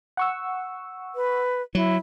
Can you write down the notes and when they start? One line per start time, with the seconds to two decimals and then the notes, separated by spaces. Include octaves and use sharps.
0.17 F#5 C#6 E6
1.15 B4
1.75 F#3 E4